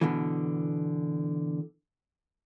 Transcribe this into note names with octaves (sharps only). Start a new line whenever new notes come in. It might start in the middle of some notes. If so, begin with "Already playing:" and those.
B2 D3 E3